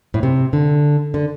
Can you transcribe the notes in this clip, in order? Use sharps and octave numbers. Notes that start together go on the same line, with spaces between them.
A2
C3
D3
D3